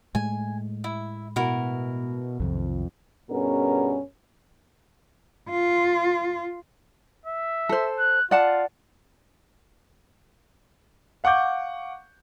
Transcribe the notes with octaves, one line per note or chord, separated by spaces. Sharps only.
A2 G#3 A3 G#5
E4 E5
B2 E4 F#4 A#4
B1 F2 C3 D#3
G2 B2 B3 C#4 G#4 A#4
F4
E5
A4 C5
F#6
F4 D5 F#5 A5
F5 F#5 C#6 D6 G6